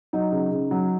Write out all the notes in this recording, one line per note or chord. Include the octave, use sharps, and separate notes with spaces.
F#3 D#4
C#3
C#3
F#3